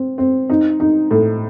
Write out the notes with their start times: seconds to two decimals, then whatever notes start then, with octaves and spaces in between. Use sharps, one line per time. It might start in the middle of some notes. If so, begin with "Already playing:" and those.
Already playing: C4
0.18 C4
0.50 D#4
0.80 D#4
1.11 A2